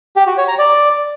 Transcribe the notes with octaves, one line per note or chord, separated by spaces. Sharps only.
G4
F#4
C#5
A#5
D5